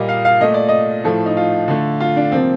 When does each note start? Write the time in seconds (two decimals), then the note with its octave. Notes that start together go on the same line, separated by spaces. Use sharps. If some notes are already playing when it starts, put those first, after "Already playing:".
Already playing: A#2 G3 A#3 D#5
0.09 F5
0.25 F5
0.40 A#2 A3 D#5
0.54 D5
0.69 D#5
1.04 A2 F3 A3 A4
1.26 D#4
1.37 F4
1.68 D3 A3
2.00 F4
2.17 D4
2.32 C3 F3 A#3 C4